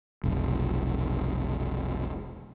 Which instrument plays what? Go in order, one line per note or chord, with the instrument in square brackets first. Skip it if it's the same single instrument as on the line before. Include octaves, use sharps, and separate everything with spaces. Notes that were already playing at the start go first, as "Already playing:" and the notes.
[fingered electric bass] F1 B1